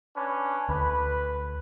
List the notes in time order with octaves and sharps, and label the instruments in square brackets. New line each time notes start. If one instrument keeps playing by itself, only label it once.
[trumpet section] C#4 D4 B4
[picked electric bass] D2 [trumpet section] B4